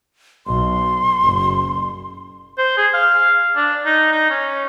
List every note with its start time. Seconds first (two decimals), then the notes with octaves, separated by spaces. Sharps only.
0.46 B1 C6
1.23 F#1
2.58 C5
2.77 G#4
2.94 F5
3.56 D4
3.86 D#4
4.12 D#4
4.30 C#4